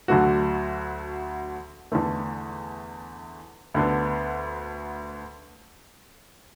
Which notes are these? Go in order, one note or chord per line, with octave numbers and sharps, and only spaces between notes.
D2 D3 F#3 A3 F#4
E2 D3 A3
D2 D3 B3